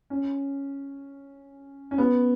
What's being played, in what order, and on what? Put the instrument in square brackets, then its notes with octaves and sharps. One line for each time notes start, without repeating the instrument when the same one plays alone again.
[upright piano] C#4
C#4
B3